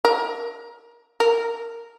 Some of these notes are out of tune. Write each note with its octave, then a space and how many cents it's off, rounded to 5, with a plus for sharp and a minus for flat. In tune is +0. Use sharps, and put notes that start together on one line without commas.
A#4 +30
A#4 -10